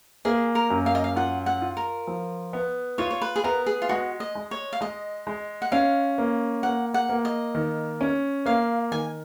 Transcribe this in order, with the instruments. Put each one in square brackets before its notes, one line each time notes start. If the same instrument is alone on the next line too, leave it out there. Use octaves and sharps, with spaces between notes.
[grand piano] A#3 [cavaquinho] G#4
[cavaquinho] A#4
[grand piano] F#2
[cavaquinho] F5
D#5
F5
[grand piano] F4 [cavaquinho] F#5
[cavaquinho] F#5
[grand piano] F4
[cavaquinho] A#4
[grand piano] F3
B3
[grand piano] F4 [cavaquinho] C#5
[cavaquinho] C#5
B4
G#4
[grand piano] B3 [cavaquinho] A#4
[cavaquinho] G#4
F4
[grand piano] G#3 [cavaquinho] F#4
[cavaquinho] D#5
[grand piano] G#3
[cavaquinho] C#5
F5
[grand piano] G#3 [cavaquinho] D#5
[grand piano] G#3
[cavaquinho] F#5
[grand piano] C#4 [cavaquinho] F5
[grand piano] A#3
[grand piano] A#3 [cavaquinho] F#5
[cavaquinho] F#5
[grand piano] A#3
[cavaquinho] D#5
[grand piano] D#3
C#4
[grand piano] A#3 [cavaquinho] F5
[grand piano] D#3 [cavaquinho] G#5